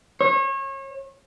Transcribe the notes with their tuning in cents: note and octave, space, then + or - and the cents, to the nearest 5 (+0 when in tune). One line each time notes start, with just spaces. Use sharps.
C#5 -35